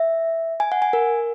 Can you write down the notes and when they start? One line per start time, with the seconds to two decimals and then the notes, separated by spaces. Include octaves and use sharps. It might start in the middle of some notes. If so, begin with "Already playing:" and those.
Already playing: E5
0.60 G#5
0.72 F#5
0.82 G#5
0.93 A#4